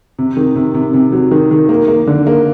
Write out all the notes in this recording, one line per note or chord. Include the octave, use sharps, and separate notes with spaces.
C3
D#3
C3
C3
C3
F#3
D#3
D#3
A#3
A#3
D3
A#3